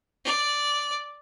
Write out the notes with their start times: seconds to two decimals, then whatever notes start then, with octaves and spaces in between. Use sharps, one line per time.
0.25 D5